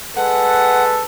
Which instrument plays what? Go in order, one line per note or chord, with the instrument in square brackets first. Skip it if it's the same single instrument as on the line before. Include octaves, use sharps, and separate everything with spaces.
[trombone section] G#3 A4 B4 [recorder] F#5